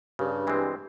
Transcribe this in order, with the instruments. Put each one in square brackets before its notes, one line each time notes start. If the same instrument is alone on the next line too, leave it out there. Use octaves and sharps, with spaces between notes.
[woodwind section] G2 [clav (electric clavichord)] C#3
[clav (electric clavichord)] E3 G#3 C4